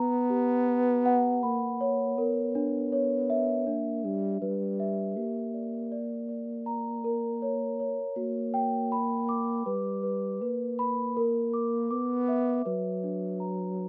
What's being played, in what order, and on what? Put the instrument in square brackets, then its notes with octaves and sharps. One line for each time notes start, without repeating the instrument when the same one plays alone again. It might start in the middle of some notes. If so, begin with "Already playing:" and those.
Already playing: [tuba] B3 [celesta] A#5
[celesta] G4
B4
F#5
[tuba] A#3 [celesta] B5
[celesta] C#5
[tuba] B3 [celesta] A#4
[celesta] D4
C#5
E5
[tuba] A#3 [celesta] D4
[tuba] G3 [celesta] D4
[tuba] G3 [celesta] B4
[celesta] E5
[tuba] A#3 [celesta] G4
[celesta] D5
D5
D5
A#5
A#4
C#5
C#5
[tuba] A#3 [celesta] F#4
[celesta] G5
B5
D6
[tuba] G3 [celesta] B4
[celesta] B4
[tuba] A#3 [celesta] B4
[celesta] B5
A#4
D6
[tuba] B3 [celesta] D6
[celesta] E5
[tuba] F#3 [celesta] B4
[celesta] D4
A#5